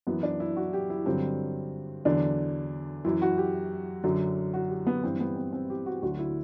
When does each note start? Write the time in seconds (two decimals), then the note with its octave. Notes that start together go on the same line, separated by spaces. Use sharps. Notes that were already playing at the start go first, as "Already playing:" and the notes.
0.07 F#2 E3 B3
0.23 D4
0.40 E4
0.56 F#4
0.73 G4
0.90 E4
1.06 G2 D3 F#3 C4
2.05 E2 D3 F#3 D4
3.05 F#2 E3 E4
3.22 F#4
3.38 G4
4.04 F#2 D3 F#3
4.54 F#4
4.70 G4
4.87 B3
5.03 G2 E3 C4
5.20 B3
5.36 C4
5.53 C4
5.70 G4
5.86 F#4
6.02 D2 D3 F#3 F#4
6.19 E4